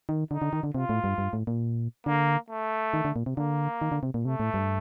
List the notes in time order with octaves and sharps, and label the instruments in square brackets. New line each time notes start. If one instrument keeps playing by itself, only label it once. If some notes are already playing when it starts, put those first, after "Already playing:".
[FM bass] D#3
[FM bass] D3 [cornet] D#4
[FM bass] D3
D#3
D3
[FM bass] C3 [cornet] F4
[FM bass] A2
G2
G2
A2
A#2
[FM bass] D3 [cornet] A#3
[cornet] A3
[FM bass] D#3
D3
A#2
C3
[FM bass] D3 [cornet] A#3
[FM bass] D#3
D3
C3
A#2
[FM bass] C3 [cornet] A3
[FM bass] A2
G2